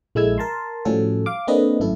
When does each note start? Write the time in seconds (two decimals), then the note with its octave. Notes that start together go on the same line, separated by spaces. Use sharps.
0.15 A#1 G#3 E4 A4 E6 G#6
0.38 A#4 A5 A#5 C6
0.85 A2 F3 G3 C#4 F#4 A4
1.26 F5 D6
1.47 A#3 C4 D4 A4 B4 D#5
1.80 G#1 F#2 A3 E4 A4